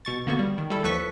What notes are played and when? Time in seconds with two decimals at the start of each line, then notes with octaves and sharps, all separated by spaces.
0.05 B2 C#6 A6
0.26 G#1 D3 A#3 B3 F#4 C#6
0.39 G3
0.58 D#3
0.70 G3 E4 A4
0.83 D#2 F3 A4 B4 C#6 B6